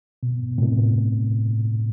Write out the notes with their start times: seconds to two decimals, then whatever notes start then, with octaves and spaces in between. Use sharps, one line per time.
0.23 B2
0.58 A2 C3